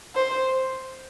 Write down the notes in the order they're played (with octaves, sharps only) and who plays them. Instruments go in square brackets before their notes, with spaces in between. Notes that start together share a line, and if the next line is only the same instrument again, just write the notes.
[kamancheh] C5